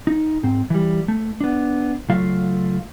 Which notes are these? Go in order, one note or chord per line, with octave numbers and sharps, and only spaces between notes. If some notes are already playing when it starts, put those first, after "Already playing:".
D#4
G#2 C4
E3 G3
A3
B3 D4
C#2 F#3 A3 F4 F5